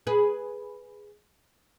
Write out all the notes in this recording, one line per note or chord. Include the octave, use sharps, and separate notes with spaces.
G#4 B4